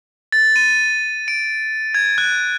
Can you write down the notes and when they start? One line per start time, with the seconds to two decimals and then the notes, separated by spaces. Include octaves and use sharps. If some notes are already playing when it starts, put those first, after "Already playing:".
0.32 A6
0.56 D#7
1.28 D7
1.95 G#6
2.18 F#6